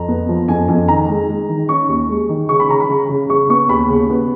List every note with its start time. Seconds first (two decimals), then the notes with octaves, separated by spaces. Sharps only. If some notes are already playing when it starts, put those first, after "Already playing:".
Already playing: F2 A#5
0.08 B3
0.29 F3
0.48 F2 G#5
0.68 F2 G#5
0.88 D#3 A#5
1.09 G#3
1.29 G#3
1.49 D#3
1.69 C#4 C#6
1.89 D#2
2.09 G#3
2.29 D#3
2.49 C#3 C#6
2.60 B5
2.69 C#3 A#5
2.80 B5
2.89 C#3
3.09 C#3
3.30 C#3 C#6
3.49 B3 C#6
3.69 D#2 B5
3.90 C#3
4.10 B3